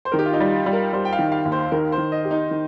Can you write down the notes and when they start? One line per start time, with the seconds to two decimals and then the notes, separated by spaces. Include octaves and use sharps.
0.05 C5
0.12 D#3 A#4
0.19 G4
0.26 F4
0.33 D#4
0.40 G3
0.53 F4
0.66 G3
0.73 A#4
0.93 G3 C5
1.05 G5
1.13 F5
1.19 D#3
1.32 F5
1.45 D#2
1.52 C5
1.72 D#3 A#4
1.92 C5
1.98 D#3
2.12 D#5
2.25 G4
2.31 D#4
2.51 D#3